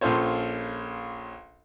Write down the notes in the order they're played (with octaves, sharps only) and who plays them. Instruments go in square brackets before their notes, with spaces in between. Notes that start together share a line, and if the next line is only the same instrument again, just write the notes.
[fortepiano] A#1 C#4 F4 A4 C5 C#5